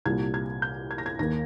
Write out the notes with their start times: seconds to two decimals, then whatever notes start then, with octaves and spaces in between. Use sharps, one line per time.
0.06 C2 A#2 G3 G#6
0.34 G#6
0.62 G6
0.91 G#6
0.98 A#6
1.06 G#6
1.19 D#2 D#3 A#3 A#6